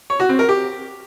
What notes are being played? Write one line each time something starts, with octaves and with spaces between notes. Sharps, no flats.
C#5
F#4
C4
A#4
G4